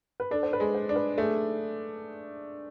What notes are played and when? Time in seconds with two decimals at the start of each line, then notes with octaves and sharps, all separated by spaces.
0.20 B4
0.31 D4 A4
0.43 C5
0.53 B4
0.60 G#3
0.75 C5
0.89 D4
0.96 B4
1.18 A3 G#4